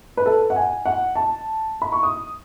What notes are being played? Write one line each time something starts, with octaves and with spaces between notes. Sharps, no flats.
B4
A4
F#5
G#5
F#5
A5
B5
C#6
D#6